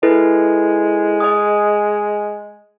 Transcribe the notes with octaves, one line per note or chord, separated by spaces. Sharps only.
G#3 E4 A4 B4
D#5 G#5 D#6